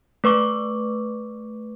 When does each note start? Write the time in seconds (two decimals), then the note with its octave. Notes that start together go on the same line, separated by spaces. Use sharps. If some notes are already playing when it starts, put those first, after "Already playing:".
0.24 A3 B4 C#6 D6